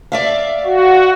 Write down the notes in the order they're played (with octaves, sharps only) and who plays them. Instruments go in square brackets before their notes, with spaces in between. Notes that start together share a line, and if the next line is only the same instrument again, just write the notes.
[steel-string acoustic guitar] D5 E5 F5
[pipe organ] F#4